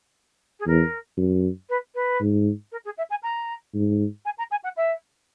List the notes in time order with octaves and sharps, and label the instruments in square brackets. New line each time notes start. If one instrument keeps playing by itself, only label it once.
[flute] G#4
[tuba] E2 [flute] A#4
[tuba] F#2
[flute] B4
B4
[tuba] G#2
[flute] A#4
G#4
E5
G#5
A#5
[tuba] G#2
[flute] G#5
A#5
G#5
F#5
E5